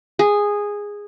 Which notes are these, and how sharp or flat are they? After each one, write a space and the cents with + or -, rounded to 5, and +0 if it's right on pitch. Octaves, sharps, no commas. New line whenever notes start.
G#4 -10